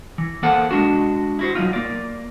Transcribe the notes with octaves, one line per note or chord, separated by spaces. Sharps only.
E3
A#3 A4 C5 F#5
G#3 D4 F#4
E4 F#4 C5
F#3 C#4 D#4 F4
A#3 D5